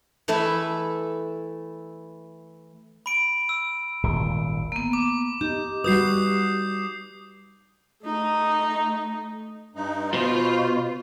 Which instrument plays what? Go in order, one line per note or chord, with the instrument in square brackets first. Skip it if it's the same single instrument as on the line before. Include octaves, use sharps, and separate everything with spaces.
[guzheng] E3 A3 E4 A4 B4
[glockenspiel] B5 D7
E6
[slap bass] D#1 G#1 A#2
[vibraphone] A#3 B3
[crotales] D6
[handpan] D#4 [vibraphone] G4
[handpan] G3 F#4 B4 [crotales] D#6 G6 C7
[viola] A3 D#4
[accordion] G2 D#4
[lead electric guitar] B2 [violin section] F4 [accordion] C5